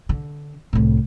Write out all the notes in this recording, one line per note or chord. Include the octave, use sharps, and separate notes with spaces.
D3
C2 A2